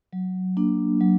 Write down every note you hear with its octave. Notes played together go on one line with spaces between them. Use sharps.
F#3
A#3 D4
F#3